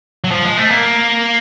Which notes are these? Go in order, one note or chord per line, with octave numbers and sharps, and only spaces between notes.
F#3
F3
G#3
A3
A#3